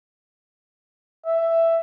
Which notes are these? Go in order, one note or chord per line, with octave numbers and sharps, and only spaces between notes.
E5